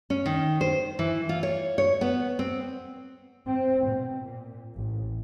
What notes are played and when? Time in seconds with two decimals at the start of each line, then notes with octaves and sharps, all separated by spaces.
0.10 C#4
0.26 D#3
0.61 C5
0.99 E3
1.29 F4
1.43 C#5
1.78 C#5
2.01 B3
2.39 C4
3.47 C4
3.85 B2
4.22 A#2
4.76 A1